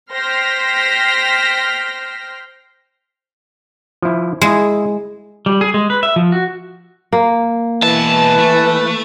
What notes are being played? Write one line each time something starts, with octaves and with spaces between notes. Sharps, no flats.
C5 G5 C6 F6 A#6 B6
F3 E4
G#3 E4 G#4
G3
G#4
G#3
B4
E5
F3
F#4
A#3
B2 E3 B4 E5 A5
A3